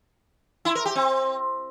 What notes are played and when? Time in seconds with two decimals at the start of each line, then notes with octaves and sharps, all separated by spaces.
0.65 E4
0.75 A#4
0.85 G4
0.96 C4